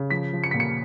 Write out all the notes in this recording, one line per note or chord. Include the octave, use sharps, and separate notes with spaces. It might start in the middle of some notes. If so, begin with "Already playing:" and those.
Already playing: C#3
F3 B6
F3
C#7
A#2 B6
C#7